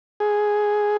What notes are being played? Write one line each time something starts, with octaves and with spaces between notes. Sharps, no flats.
G#4